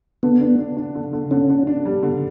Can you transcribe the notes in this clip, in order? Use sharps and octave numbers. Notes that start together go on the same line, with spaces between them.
D3 B3
D4
D4
D4
D3
D3
D3 C#4
D3
D4
G3
D3